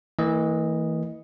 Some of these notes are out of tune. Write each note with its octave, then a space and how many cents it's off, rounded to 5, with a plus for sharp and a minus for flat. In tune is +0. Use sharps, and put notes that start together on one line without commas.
E3 -20 A#3 -45 D#5 +0